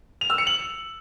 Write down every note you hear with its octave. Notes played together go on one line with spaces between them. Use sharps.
F7
E6
C#7
F#7